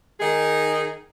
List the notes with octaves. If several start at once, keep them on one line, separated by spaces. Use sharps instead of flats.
D#3 D#4 G#4